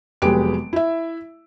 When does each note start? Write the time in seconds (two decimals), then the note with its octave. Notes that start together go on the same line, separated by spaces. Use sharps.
0.22 F1 F#3 G#3 B3 G4 D7
0.73 E4 E5